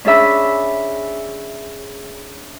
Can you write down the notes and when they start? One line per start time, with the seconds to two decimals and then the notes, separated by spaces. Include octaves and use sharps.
0.05 C#4 D4 G#4 E5 B5